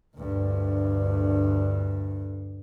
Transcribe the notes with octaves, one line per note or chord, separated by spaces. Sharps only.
D2 G2